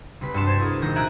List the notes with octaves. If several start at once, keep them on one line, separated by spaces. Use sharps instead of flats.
C2 C3 B4 B6
G2 F#4 A5 C6 E7
C5 G#6 A6
E4 F#4 G#4 A#4
D#1 D#3 G6 A#6
E5 G#5 A#5 F#6 G#6 D7